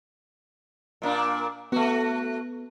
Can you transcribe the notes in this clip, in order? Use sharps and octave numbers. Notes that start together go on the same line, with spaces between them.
A#2 A#3 D4
A3 B3 F#4